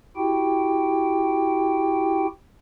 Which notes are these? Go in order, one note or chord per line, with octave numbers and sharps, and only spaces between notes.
E4 F#4 G4 G5